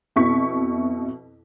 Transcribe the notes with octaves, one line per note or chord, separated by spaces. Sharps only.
F2 B2 E4 C#6 B6